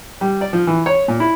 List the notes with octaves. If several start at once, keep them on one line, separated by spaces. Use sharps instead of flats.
G3
D5
F3
E3
C#5
A#2
E4